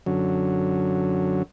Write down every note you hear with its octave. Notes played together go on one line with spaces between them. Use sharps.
F#2 D3 F#3